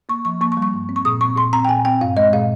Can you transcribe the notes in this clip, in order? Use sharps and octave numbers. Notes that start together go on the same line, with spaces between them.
A#3 C#6
F3 C#6
A#3 C#6
C#6
G3
C#6
G2
C4
C#6
A#2 D#6
C4 C#6
A#2 C6
C4 A#5
G5
A#2 G#5
C4 G5
G2 F5
G#3 D#5
A#2 F5